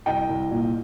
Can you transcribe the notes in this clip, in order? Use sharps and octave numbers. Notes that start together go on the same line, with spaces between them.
C2 D#5 G5
C2
A#2